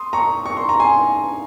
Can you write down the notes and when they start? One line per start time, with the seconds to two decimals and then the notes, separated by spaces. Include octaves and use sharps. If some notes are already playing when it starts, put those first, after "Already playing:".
Already playing: C6 D#6
0.13 A#5 C#6
0.46 C#6
0.57 C6
0.69 A#5
0.80 G#5 C6